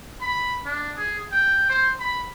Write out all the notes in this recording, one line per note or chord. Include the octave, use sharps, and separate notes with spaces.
B5
D4
G#4
G5
C5
B5